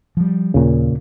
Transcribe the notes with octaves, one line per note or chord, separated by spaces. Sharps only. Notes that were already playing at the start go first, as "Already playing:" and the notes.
F3 G3
D#2 A#2 C#3